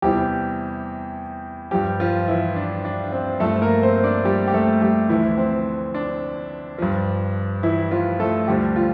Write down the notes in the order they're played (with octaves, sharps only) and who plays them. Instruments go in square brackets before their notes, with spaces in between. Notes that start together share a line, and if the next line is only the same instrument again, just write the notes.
[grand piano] E2 C3 E3 G3 G4
G2 F3 G3 G4
F3 F4
E3 E4
D4
D4
C4
G2 F3 A3 A4
A#3 A#4
C4 C5
D4 D5
G3 G4
G4
A3 A4
G3 G4
D2 D3 E3 F3 E4
C4
D4
G2 F3
E3 E4
F3 F4
A3 A4
D2 D3 F3 G3 G4
F3 F4